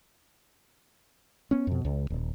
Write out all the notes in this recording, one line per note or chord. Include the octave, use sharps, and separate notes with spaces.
B3 C#4
F2 B2
C#2
D#1